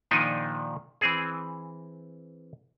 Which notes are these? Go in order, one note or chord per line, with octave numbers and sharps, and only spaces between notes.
A#2 D#3 F3 D4 D#4 G#5
E3 C4 G#4